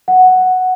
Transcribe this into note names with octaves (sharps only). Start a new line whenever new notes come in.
F#5